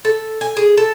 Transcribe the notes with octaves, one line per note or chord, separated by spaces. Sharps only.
A4
G#5
G#4
A4